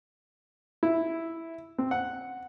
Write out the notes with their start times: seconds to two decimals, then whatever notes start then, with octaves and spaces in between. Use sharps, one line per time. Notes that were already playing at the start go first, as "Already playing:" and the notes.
0.83 E4
1.78 C4
1.91 F#5